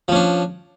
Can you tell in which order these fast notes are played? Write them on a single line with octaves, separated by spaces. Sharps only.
F3 C#4 D4